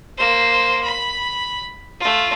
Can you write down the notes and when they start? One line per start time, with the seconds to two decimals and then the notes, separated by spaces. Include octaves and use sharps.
0.17 A#3 C5
0.83 B5
1.99 A3 F4